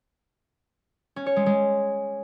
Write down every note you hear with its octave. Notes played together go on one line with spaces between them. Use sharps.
C#4
C#5
G#3
G#3